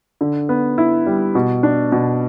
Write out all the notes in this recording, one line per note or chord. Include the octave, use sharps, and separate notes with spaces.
D3
B3
E4
G3
B2
D4
B2